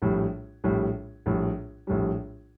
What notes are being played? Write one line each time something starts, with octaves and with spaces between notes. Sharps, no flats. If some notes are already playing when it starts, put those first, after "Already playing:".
A#1 A2 G3
A#1 A2 G3
A#1 A2 G3
A#1 A2 G3